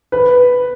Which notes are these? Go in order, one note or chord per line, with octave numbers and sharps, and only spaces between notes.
B4